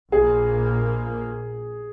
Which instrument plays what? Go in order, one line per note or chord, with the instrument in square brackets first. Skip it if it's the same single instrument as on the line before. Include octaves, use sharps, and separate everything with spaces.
[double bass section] A#1 A#2 A#3 [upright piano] G#4